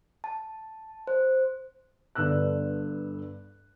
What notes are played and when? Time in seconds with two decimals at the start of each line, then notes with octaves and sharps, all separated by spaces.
0.24 A5
1.07 C5
2.15 G1 G2 D3 B4 E6 F#6